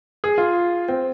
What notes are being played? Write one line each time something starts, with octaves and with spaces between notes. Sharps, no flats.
G#4
F4
C4